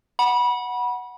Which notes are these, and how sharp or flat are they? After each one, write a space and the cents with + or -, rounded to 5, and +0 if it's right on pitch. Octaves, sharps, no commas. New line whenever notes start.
F#5 +0 B5 -25